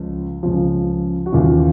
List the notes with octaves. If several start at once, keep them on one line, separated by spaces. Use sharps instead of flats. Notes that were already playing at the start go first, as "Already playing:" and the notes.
Already playing: C#2 C#3 F3
C#2 C#3 F3
F#4
D#2 C#3 E3 F4